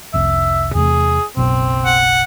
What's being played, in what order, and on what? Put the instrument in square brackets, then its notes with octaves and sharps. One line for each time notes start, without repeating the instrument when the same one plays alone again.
[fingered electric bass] F1 C2 [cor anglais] E5
[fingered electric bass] E2 C3 A3 [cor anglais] G#4
[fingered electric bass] F#1 B1 B2 [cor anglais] C4
[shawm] F#5